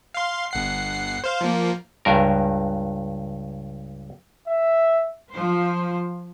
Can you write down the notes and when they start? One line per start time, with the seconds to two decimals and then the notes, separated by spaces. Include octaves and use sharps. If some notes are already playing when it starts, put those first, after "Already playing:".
0.14 F5 C6
0.51 G1 F#5 C7
1.24 C5 F5
1.41 F3 A#3
2.05 C#2 G2 A#4
4.48 E5
5.31 F3 C5